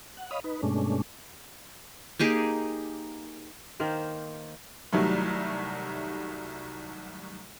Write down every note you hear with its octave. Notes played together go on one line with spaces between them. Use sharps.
F#5
C#5 D#5 F5 B5 D#6
D#4 B4
G2 B2 G#3 A3 C#4 D4
A#3 D#4 G4 G#4
D#3 A#3 C5
C2 D#3 F#3 G3 A3